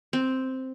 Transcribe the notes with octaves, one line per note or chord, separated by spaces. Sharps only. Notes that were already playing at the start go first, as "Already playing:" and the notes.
C4